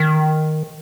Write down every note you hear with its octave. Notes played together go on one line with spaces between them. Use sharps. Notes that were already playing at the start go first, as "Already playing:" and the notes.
Already playing: D#3